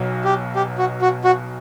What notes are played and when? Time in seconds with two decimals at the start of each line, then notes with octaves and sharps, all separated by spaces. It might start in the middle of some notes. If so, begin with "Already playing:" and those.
Already playing: B1 B2 F#3
0.24 G4
0.55 G4
0.78 F#4
1.02 F#4
1.24 F#4